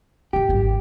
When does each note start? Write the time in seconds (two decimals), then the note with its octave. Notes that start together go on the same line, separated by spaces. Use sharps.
0.33 G1 D#3 G4
0.49 G#1 F#2